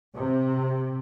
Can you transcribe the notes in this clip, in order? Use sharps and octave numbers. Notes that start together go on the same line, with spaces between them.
C3